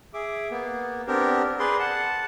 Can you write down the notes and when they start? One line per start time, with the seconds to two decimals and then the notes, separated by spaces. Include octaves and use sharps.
0.14 G#4 E5 D6
0.51 A#3 B3
1.07 B3 C4 D4 G4 A#4
1.59 G#4 B4 D5 C6
1.79 F#5 A5